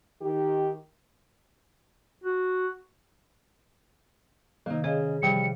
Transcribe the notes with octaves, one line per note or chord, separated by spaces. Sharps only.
D#3 G4
F#4
C3 D#3 A#3 D#4
C#3 G#4 C#5 D#5
C3 E3 F3 G3 G5 C#7